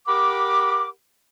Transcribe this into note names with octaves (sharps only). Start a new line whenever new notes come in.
G4 A#4 F#5 B5 D6